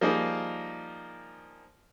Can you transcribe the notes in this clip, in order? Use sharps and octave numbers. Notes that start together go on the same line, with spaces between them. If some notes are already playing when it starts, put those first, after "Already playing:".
F3 G3 A#3 D#4 G#4 A#4